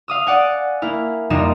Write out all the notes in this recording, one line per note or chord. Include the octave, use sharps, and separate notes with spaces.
F5 D#6 E6
D5 F#5 G#5
A#3 E4 F6
F2 C3 G3 A#3 D#4 E7